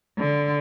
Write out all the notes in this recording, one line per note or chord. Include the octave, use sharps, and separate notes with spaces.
D3